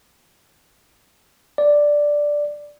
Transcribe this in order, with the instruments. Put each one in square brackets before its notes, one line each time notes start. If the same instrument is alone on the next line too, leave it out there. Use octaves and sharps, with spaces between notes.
[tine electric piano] D5